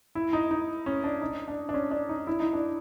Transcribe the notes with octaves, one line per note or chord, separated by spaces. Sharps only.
E4
D#4
D#4
C#4
D4
D#4
D4
D4
C#4
D4
D#4
E4
D#4
D4